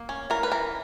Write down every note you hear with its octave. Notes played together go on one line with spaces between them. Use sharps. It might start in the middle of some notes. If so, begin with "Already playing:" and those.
Already playing: A#3
C#4
E3 A#4
B4
E3 A#4